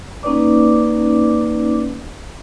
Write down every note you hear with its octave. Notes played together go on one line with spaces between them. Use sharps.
A#3 C#4 D#4 B4 D5 D6